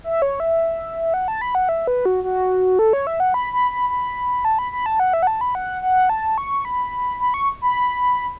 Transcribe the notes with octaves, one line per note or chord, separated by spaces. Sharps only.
E5
C#5
E5
F#5
A5
B5
F#5
E5
B4
F#4
F#4
A4
C#5
E5
F#5
B5
B5
B5
B5
A5
B5
B5
A5
F#5
E5
F#5
A5
B5
F#5
F#5
A5
C#6
B5
B5
C#6
B5